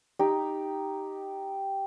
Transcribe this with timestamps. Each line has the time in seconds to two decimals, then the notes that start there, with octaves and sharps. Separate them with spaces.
0.19 D#4 G4